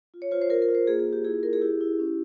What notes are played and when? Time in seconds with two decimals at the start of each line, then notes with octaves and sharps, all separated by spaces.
0.14 F4
0.22 C#5
0.31 F4 C5
0.42 C5
0.50 F4 A#4
0.62 A#4
0.69 F4
0.75 C5
0.87 A#3 G#4
1.00 G#4
1.05 F4
1.13 G4
1.25 E4 G#4
1.43 E4 A#4
1.53 G#4
1.61 E4 G4
1.81 E4
2.00 C#4